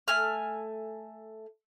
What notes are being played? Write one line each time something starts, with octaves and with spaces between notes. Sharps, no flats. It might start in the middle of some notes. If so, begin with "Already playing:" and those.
A3 G#5 F6